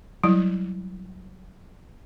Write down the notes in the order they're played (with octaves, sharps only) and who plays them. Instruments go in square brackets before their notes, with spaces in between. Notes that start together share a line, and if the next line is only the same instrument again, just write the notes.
[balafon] F#3 G3 E4